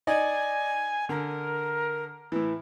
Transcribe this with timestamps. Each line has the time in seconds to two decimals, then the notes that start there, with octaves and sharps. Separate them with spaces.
0.07 D#4 D5 D#5 G#5
1.09 D3 A#4
2.32 A2 E3